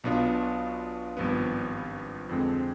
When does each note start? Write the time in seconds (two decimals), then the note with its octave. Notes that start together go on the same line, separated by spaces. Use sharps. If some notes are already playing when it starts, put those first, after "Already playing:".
0.04 B1 B2 B3 D4 F4
1.17 G#1 G2 F3 B3
2.29 F2 D3 G#3 C4